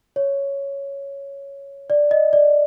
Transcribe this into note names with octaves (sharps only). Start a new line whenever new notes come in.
C#5
D5
D#5
D5